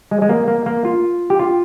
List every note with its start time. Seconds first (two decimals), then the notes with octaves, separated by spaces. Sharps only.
0.11 G#3
0.22 G#3
0.29 A#3
0.48 A#3
0.66 A#3
0.85 F4
1.30 G4
1.39 F4